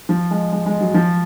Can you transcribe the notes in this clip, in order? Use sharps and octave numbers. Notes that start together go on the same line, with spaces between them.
F3
G#3
G#3
G#3
F#3
F3